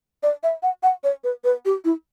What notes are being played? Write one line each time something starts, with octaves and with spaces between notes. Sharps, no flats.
D5
E5
F#5
F#5
C#5
B4
B4
G4
E4